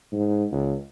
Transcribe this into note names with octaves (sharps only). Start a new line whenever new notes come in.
G#2
C#2